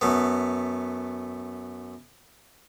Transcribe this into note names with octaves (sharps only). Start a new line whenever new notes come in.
F#2 A3 B3